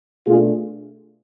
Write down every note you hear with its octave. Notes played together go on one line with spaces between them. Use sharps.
B2 A3 D4 F4 G#4